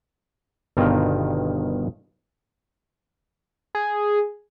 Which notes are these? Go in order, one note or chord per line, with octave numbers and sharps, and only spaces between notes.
G1 G2 B2 D#3 F4 A#4
G#4